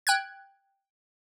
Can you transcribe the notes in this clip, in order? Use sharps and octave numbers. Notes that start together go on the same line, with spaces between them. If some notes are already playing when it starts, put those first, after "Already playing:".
G5 F#6 G#6